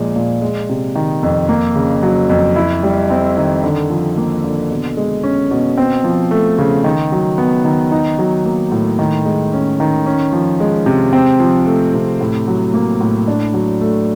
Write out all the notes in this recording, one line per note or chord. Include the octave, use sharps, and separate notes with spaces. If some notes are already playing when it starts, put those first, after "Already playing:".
Already playing: A#2 F3 G#3
A#2
G#3
C3
D#3
F2
A#3
C#3
F#3
F2
E4
G3
C4
D#3
D3
F3
A#3
D3
B2
G#3
C#4
B2
C4
F3
A3
C#3
D#3
F#3
B3
D#3
D#4
F#3
A#3
A2
D#3
G#3
C#4
D#3
C#4
F3
G#3
C3
C4
F3
A3
C3
A2
F#3
A#3
A2
D4
F#3
A3